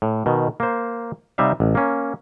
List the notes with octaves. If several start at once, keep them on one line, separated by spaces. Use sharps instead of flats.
A2
B2 D#3
A#3 C5
C3 G3 D#4 E5 F5
A1
A#3 C#4